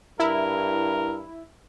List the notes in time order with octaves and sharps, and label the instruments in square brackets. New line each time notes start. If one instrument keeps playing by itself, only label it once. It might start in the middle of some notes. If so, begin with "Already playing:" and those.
[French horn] G2 [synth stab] E4 [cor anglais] A#4